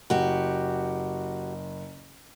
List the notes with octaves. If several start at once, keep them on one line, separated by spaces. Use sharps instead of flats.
F#1 F#4 G4